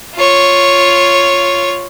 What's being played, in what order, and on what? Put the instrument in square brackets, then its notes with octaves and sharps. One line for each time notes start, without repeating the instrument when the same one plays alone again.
[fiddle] F4 C#5